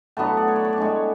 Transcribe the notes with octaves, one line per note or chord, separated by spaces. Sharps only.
A2 F#3 B3 D4 A5
F#5
D5
C#5
D5
C#5
D5
A2 G#3 D4 C#5